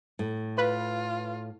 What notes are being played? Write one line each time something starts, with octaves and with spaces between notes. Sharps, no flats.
A2
F4 B4